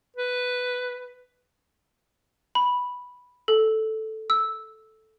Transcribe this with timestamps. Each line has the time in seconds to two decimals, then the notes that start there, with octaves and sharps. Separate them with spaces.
0.16 B4
2.55 B5
3.48 A4
4.30 E6